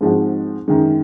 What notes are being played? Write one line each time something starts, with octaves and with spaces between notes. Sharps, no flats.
G#2 F3 G#3 C4 F#4
F#2 D#3 G#3